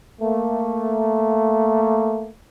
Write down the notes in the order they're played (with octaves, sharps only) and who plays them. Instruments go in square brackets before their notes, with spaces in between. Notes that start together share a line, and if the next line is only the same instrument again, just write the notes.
[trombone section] A3 A#3